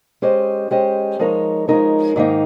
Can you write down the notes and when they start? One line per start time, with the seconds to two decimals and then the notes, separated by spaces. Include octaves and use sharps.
0.22 G#3 C#4 G4 C5 D#5
0.71 G#3 C#4 G4 C5 D#5
1.19 F3 G#3 D#4 A#4 C#5
1.68 F3 G#3 D#4 A#4 C#5
2.16 G#2 D#3 A#3 D#4